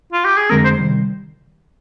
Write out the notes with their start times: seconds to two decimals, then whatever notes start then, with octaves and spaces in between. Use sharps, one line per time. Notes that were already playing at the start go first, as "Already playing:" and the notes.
0.13 F4
0.25 G4
0.37 G#4
0.50 F2 D3 G#3 C4 A#4
0.64 C5
0.79 C3 D#3 G3